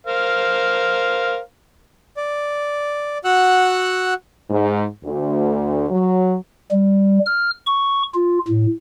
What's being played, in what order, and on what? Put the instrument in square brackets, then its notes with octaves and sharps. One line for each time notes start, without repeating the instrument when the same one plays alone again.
[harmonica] A#4 C5 F5
[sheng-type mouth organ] D5
F#4 F#5 E6 F#6
[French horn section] G#2
D2
F#3
[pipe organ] G3
F6
C#6
F4
A2